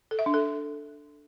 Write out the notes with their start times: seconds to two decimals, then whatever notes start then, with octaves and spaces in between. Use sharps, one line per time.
0.11 A4
0.19 E5
0.26 D4
0.34 A4